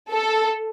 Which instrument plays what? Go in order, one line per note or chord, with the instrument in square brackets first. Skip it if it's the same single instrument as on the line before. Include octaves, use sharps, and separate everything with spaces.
[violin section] A4